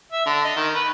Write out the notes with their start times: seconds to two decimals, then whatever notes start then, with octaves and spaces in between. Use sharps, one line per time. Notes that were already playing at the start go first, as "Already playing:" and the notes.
0.12 E5
0.26 D3
0.45 D#5
0.56 D#3
0.75 B4